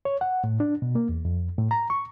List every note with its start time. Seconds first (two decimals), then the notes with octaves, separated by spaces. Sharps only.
0.05 C#5
0.21 F#5
0.44 A2
0.60 D4
0.82 B2
0.95 A#3
1.09 E2
1.25 F2
1.58 A2
1.71 A#5
1.90 C#6